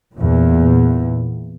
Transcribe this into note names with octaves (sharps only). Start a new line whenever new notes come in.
E2 A#2